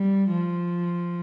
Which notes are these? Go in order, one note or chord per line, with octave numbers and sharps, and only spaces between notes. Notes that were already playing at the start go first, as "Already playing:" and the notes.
Already playing: G3
F3